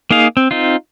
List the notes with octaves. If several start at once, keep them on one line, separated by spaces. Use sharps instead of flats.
A#3 D#4 G#4 F5
C4
C4 D#4 F4